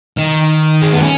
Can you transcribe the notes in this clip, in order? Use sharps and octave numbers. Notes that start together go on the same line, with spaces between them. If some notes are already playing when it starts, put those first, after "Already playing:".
D#3
G#3
B3
C#4